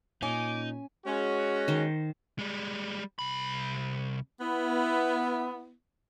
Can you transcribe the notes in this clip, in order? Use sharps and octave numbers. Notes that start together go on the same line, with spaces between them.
A#2 C#4 D#4 G#5 D6
G#3 C#4 F#4
D#3 C5
G3 G#3
C2 B5
B3 E4